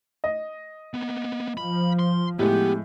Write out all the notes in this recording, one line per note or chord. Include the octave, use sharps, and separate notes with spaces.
D#5
A#3 B3
F3 B5
C6
A2 G#3 B3 G4